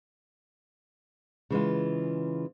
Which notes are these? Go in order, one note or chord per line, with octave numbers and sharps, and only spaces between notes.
C#3 E3 G#3 F4